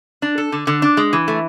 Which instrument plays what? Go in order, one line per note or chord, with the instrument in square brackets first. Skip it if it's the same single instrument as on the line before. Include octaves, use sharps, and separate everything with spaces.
[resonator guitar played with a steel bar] D4
A4
D3
D3
D4
G#3
E3
A3